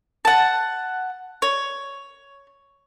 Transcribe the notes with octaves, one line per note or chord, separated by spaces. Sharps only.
F#5 A5
C#5